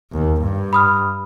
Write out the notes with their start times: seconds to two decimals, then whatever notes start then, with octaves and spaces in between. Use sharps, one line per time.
0.12 D#2
0.41 G2
0.73 B5 D#6 F6